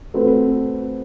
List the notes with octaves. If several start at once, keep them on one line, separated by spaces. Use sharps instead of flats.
A3 C4 F#4 B4